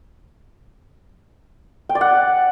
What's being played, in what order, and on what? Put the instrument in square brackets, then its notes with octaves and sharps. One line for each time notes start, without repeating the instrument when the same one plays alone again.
[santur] G5
D5
F#5